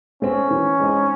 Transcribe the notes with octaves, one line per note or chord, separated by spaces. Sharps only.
A3 C4 C#4
E3
G#3 C4 D#4